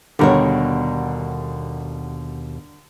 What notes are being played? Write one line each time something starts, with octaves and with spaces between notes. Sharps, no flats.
D#2 B2 D3 G3 A#4 C#5